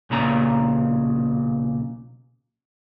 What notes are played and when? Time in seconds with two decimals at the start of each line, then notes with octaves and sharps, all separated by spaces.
0.10 B1 A#2 C#3 A#5